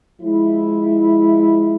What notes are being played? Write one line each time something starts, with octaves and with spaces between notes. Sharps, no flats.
F3 G#3 E4